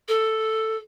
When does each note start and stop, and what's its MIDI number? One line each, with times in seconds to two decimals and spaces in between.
0.08 0.77 69